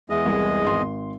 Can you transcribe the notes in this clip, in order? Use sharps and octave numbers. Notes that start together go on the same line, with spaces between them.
E2 G#3 D#5 E5
C2
G#1 C6